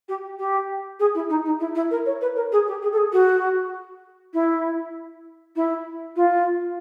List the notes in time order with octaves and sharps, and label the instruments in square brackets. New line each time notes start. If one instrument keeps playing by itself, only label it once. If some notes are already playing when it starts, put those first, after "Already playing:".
[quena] G4
G4
G#4
E4
D#4
D#4
E4
E4
A#4
C#5
B4
A#4
G#4
G4
G#4
A4
G#4
F#4
E4
E4
F4